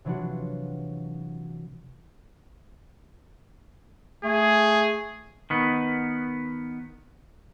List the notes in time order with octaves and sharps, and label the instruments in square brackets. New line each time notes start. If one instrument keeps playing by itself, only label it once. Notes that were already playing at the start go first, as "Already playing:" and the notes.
[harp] C3 E3 F#3 D4 F4 F#4
[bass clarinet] A3 [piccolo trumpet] G#4
[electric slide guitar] D#3 B3